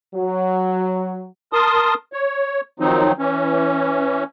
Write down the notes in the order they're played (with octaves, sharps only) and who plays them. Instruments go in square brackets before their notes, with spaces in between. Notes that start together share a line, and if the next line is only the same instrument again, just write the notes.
[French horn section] F#3
[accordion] A#4 A5 C6 D#6
C#5
D#3 F3 F#3 C4 D#4
E3 C#4